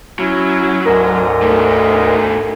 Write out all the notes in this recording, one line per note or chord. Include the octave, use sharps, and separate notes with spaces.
F#3 C#4 E4
D2 G#2 A#4 D#5
D#3 A3